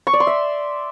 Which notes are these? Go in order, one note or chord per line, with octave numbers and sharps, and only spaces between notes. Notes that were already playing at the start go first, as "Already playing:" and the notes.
C#6
D5
C6
E5